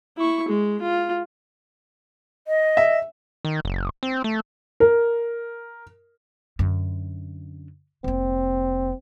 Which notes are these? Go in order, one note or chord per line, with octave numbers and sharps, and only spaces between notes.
E4 C#6
G#3
F4
D#5
E5
D#3
F#1
C4
A3
A#4
F#2 D3
F1 A#3 C4